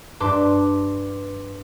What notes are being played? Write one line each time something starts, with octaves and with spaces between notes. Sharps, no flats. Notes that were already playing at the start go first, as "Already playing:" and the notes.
G2 B4 A5 C6 D6